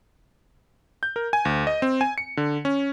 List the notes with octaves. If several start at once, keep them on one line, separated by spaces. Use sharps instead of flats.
G6
A#4
G#5
D2
D#5
C4
G#5
C#7
D3
C#4